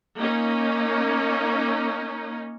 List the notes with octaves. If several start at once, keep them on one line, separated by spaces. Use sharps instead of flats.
A#3 C#4 D#4